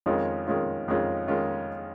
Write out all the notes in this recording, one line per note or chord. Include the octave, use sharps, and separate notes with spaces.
F2 D#3 G#3 C#4 F4
F2 D#3 G#3 C#4 F4
F2 D#3 G#3 C#4 F4
D#3 G#3 C#4 F4